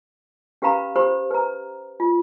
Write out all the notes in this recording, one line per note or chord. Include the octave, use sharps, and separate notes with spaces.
C#4 G4 B4 F5 A#5 B5
G4 C5 B5
B4 A#5
F4